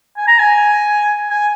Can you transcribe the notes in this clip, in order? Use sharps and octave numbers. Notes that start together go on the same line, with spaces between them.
G#5
A#5
G#5
G#5